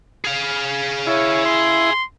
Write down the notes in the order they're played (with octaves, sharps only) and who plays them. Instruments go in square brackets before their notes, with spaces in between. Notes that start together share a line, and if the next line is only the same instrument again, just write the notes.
[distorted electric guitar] G#4 F5
[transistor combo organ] E4 [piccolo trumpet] C#5
[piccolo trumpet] C6